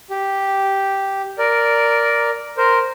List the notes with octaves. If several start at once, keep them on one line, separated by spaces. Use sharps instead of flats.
G4
A#4 D5
A#4 C5